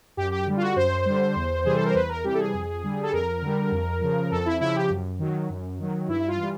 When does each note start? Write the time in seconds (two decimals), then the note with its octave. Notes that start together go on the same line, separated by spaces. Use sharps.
0.17 F#2 G4
0.31 G4
0.46 D3 G3
0.57 F4
0.61 F#4
0.76 F#2 C5
1.05 D3 G3
1.36 E2
1.65 C3 E3 G3 G#4
1.75 A4
1.84 A#4
1.94 E2 B4
2.09 A#4
2.24 C3 E3 G3 G4
2.34 A4
2.39 G#4
2.54 F2
2.83 D3 G3
3.03 A4
3.13 F2 A#4
3.42 D3 G3
3.71 F2
4.01 C#3 F3
4.31 F2 A4
4.46 E4
4.61 C#3 F3 E4
4.75 G4
4.90 F#2
5.19 D#3 F#3
5.49 F#2
5.79 D#3 F#3
6.08 G2 E4
6.28 F4
6.38 E3 G3